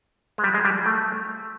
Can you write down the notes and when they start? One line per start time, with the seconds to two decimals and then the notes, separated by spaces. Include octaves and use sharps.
0.38 G#3
0.44 G3
0.54 G#3
0.65 G3
0.86 A3